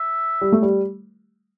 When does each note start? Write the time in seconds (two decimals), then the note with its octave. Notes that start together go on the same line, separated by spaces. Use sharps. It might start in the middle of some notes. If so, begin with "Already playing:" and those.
Already playing: E5
0.41 G3
0.52 A3
0.62 G3